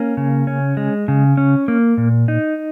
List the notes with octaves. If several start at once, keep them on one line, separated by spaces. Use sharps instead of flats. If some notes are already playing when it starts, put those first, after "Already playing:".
Already playing: A#3 C#4
C#3
C#4
G#3
C#3
C#4
A#3
A#2
D#4